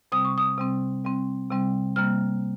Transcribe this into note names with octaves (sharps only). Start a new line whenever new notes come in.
C3 G3 C4 D#6
C#6
D#6
C3 G3 C4
C3 G3 C4
C3 G3 C4
C3 G3 A#3 F6